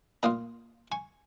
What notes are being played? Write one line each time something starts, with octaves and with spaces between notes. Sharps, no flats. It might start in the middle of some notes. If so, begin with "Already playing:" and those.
A#2 A#3 F4 A#5 D#6
G#5 C#6